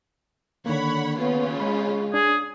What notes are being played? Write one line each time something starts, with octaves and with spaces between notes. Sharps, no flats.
D3 D#3 A#3 C#5 F#5 B5
C#3 B3 C#4 F4
G#3 B5
D4 G#4